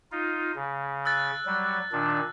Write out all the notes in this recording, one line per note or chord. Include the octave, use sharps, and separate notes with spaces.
D#4 F4
C#3
E6 F#6 A6
F#3 G3
A#2 D#3 D4